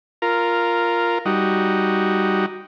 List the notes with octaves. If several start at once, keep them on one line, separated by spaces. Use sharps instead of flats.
F4 A#4
G3 D#4 F#4